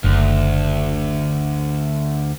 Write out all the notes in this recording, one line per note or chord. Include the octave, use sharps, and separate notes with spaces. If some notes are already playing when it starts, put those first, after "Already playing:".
F#1 D2